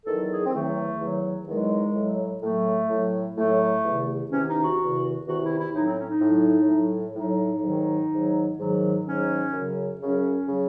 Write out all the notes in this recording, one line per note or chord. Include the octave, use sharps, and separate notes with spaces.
E2 D#3 F#3 A4
G#4
C4
E2 D#3 F#3 A3
E2 D#3 F#3
E2 D#3 F#3 G#3
A2 F#3
A2 F#3 A3
A2 F#3
A2 F#3 A3
E2 C3 D#3
E2 C3 D#3 C#4
D#4
F#4
E2 C3 D#3
E2 C3 D#3 F#4
E4
E4
A2 F#3 D#4
C4
C#4
D#4
A2 F#3
A2 F#3
A2 F#3 D#4
G#2 D#3 F#3
G#2 D#3 F#3
G#2 D#3 F#3
G#2 D#3 F#3 C#4
F#2 C#3 F#3
F#2 C#3 F#3 C#4
C#3 F#3